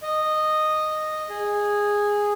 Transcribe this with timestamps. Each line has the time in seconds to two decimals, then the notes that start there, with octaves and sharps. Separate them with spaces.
0.02 D#5
1.30 G#4